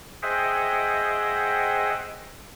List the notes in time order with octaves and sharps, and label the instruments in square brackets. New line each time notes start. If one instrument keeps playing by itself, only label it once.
[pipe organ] G#4 C5 D#5 E5 F#5 G5